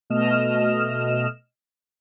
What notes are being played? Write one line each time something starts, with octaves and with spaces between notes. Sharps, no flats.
B2 A3 D#5 F6 E7